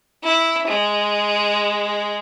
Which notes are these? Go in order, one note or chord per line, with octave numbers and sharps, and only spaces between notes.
E4
G#3